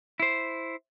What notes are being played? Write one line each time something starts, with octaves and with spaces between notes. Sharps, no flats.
E4 C5